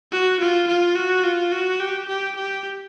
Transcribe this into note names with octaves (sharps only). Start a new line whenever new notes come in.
F#4
F4
F4
F#4
F4
F#4
G4
G4
G4